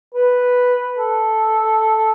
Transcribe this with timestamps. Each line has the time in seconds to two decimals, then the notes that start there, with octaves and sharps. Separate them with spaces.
0.14 B4
0.98 A4